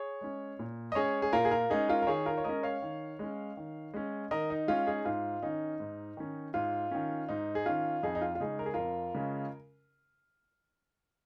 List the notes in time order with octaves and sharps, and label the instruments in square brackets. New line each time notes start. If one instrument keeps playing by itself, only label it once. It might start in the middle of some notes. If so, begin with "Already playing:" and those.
Already playing: [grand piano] G#4 C#5
G#3 C#4
A#2
D#5
G#3 C#4 G#4 C#5
G#4
A#2 F4 A#4
G#4
F4 A#4
G#3 C#4 D#4 G#4
F4 A#4
A#4
D#3 G#4 C#5
F4 A#4
C#5
G#3 C#4 A#4 D#5
C#5 F5
D#3
G#3 C#4
D#3
G#3 C#4
D#3 A#4 D#5
D#4
G#3 C#4 F4
D#4 G#4
G#2 F4
D#3 C#4 D#4
G#2
D#3 C#4
G#2 F4
D#3 C#4
G#2 D#4
G#4
D#3 C#4 F4
F2 D#4 G#4
D#4
F4
F4
C#3 G#3 C#4 D#4 G#4
A#4
G#4
F2 F4 A#4
C#3 G#3 C#4